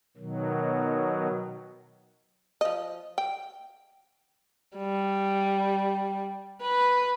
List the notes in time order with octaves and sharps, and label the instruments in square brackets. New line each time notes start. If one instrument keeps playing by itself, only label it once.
[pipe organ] B2 D#3 F#3
[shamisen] F3 D#5
G5
[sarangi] G3
B4